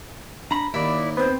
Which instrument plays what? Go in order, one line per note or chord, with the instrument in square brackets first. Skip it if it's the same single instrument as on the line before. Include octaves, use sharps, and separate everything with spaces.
[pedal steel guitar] D4 B5 [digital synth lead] A#5
[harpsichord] D#2 [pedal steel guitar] E4 D5 [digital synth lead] B5
[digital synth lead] B3 [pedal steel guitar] C4 [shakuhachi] C5